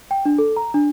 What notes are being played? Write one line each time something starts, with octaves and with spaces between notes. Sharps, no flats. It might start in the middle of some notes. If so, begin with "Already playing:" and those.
G5
D4
A4
A#5
D4